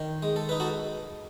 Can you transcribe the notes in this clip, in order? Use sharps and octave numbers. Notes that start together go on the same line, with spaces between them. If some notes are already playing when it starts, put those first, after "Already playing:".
Already playing: D#3
G#3
A4
D#4 B4
F#4 A4